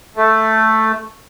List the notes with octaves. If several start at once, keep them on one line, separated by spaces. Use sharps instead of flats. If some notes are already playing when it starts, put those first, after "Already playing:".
A3